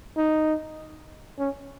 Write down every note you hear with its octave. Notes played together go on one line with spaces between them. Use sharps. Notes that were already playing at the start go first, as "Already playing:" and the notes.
D#4
C#4